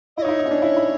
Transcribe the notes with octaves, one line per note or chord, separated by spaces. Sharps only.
E4 D#5
D#4 C#5
E4
D#4
C#4
D4
E4
E4